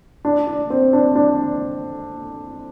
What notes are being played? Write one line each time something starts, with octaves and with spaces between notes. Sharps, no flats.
D4
D4
C4
D4
D4